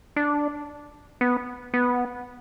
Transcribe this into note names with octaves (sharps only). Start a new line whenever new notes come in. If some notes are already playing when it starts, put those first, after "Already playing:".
D4
B3
B3